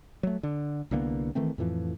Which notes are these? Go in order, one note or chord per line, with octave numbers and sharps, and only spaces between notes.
F#3 A3
D3
C2 D3 A#3 B3
D#3 E3 A3 C4
F2 A2 E3 F3